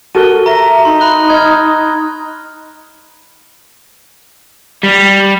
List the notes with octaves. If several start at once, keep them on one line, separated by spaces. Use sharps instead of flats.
F#4 A4 A#4 D#7 G7
E5 A#5 A#6
D#4 C6
B5 F#6 G7
D#5 F6 G#6
G3